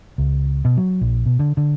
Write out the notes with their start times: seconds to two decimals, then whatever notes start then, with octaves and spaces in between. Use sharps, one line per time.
0.18 C#2
0.65 B2
0.77 F#3
1.01 A#1
1.26 B2
1.39 D3
1.57 D3